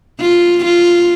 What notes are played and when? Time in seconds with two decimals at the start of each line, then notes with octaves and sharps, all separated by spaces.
0.21 F4
0.65 F4